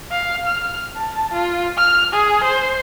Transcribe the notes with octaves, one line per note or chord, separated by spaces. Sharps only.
F5
F6
A5
F4
F6
G#4
C5